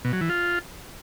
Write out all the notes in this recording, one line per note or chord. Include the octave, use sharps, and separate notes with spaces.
B2
F#3
E3
F4